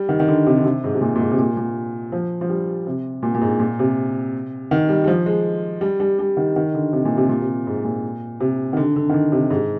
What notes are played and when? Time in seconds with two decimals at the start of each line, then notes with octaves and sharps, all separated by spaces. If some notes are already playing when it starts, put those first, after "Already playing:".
Already playing: G3
0.09 D#3
0.20 D#3
0.28 D3
0.47 C3
0.57 D3
0.65 C3
0.84 G#2
0.94 C3
1.01 A#2
1.16 A#2
1.20 G#2
1.31 C3
1.39 A#2
1.57 A#2
2.12 F3
2.41 F3
2.49 G3
2.87 C3
3.23 A#2
3.35 A#2
3.41 G#2
3.60 A#2
3.79 C3
4.71 D#3
4.89 G3
5.04 G3
5.08 F3
5.26 G#3
5.81 G3
6.00 G3
6.19 G3
6.37 D#3
6.56 D#3
6.74 D3
6.93 C3
7.05 A#2
7.17 C3
7.29 A#2
7.41 C3
7.67 G#2
7.84 A#2
8.40 C3
8.73 D#3
8.77 D3
8.96 D3
9.09 D#3
9.14 D3
9.32 C3
9.50 G#2